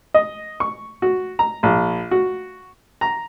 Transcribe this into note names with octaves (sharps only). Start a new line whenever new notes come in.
D#5
C#6
F#4
A#5
A#1
F#4
A#5